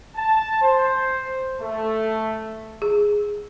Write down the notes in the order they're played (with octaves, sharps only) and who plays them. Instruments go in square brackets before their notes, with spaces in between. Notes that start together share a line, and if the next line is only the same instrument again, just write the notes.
[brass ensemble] A5
C5
A3
[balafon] G#4